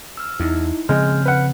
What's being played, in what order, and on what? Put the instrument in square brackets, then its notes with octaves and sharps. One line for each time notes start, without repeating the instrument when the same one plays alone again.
[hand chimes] E6 F6
[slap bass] E2 [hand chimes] D#4 E4
[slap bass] C#3 F3 C4 [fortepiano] G#3 [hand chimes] F6 G6
[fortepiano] B4 F#5